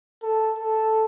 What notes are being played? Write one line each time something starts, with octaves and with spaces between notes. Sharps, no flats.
A4
A4